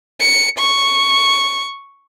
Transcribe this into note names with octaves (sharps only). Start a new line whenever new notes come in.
C#7
C#6